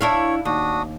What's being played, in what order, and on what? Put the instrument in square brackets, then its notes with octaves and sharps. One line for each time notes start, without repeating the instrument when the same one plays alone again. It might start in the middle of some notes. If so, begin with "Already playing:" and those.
[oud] D4 E4 F5 [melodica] C#5
[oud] D#2 [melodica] D4 F#4 D#6